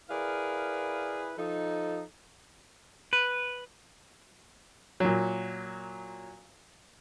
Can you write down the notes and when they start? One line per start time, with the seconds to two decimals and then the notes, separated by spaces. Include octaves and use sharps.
0.10 E4 G#4 A#4 B4 D5 F5
1.38 F3 D#4 A4
3.13 B4
5.00 A#2 F#3